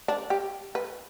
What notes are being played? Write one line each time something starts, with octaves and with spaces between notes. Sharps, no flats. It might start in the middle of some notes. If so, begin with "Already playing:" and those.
D4
G4
B4